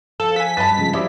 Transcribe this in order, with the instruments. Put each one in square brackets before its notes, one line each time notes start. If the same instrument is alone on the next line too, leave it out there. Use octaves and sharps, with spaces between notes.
[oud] F3 [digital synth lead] A4
[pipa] F#5 G#5 [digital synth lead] B6
[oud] G2 F#3 [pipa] B4 D#5 A5 [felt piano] B5 A6
[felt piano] C#3 F3 G#3
[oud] F3 F#3 A#3 [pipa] E4 [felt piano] G4 D5 D6